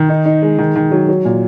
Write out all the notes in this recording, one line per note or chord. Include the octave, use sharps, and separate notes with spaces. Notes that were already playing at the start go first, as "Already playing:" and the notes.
Already playing: D#3
D#4
D#4
G#3
D#3
D#3
F#3
F#3
A#2